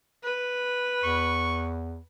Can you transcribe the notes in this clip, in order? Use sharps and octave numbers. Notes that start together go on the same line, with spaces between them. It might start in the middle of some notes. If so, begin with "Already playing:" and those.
B4
E2 C#6